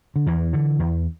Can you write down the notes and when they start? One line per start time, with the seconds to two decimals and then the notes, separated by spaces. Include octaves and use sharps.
0.16 D3
0.26 E2 E3
0.53 D3
0.79 E2